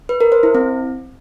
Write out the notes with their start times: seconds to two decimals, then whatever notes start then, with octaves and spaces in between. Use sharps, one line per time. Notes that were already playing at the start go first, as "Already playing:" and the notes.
0.09 B4
0.21 A#4
0.32 C5
0.43 E4
0.55 C4